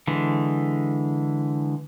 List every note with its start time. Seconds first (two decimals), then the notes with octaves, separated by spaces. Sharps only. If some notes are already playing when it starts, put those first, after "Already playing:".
0.07 D3 E3 G#3